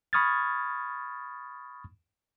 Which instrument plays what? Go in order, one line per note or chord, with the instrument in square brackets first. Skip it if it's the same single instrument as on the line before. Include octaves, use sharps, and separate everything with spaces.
[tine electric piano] B5 C#6 D#6 F6 G#6 A6